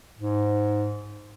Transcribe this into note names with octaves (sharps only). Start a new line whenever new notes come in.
G#2